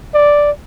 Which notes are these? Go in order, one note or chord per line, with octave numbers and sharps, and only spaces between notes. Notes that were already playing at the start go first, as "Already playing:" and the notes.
D5